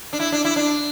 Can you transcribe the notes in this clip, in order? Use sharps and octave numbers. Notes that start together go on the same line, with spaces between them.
D4
E4
D4
E4
D4